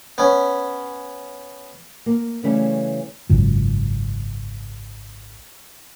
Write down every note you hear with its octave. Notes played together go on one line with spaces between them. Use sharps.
B3 C#4
A#3
C#3 E3 G3 A3 C#4
G#1 C#2 F#2